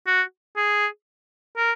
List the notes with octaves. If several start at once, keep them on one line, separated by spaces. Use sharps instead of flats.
F#4
G#4
A#4